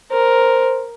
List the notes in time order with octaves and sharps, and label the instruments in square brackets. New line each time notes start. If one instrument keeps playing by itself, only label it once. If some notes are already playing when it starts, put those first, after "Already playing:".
[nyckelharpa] A#4 [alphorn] C5